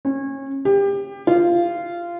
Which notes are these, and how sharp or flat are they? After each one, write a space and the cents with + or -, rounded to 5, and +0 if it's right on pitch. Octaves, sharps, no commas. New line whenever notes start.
C#4 -30
G4 +25
F4 -15